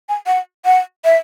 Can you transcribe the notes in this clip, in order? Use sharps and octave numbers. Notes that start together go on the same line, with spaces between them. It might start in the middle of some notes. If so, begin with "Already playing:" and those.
G#5
F#5
F#5
E5